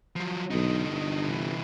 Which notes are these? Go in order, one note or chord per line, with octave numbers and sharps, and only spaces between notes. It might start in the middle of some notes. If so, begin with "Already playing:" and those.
F3 F#3
B1 D3 D#4
G1
C3 E3